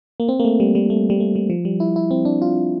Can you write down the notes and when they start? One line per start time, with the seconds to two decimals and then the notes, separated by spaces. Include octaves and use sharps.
0.20 A#3
0.29 C4
0.40 A#3
0.45 A3
0.60 G3
0.75 G3
0.90 A3
1.10 G3
1.20 A3
1.36 G3
1.50 F3
1.65 G3
1.80 E4
1.96 E4
2.11 C4
2.25 D4
2.42 F4